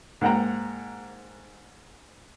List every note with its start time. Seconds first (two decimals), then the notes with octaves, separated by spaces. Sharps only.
0.21 G#2 A#3 F#5 G5 A#5